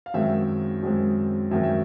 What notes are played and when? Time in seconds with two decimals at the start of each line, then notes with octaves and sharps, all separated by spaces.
0.06 F5
0.14 F#2 D#3 G#3 C4 E5
0.83 F#2 D#3 G#3 C4
1.51 F#2 D#3 G#3 C4 E5
1.63 E5